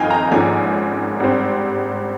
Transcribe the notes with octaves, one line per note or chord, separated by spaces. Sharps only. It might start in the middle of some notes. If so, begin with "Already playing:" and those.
Already playing: G1 F2 D#3 D#5 F5 G5 G#5
A#5
G#1 G#2 F3 A#3 C#4 G#5
G#1 G2 G3 C4